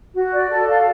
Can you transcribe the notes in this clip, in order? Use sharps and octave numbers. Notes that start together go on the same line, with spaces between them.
F#4
D5
A4
F5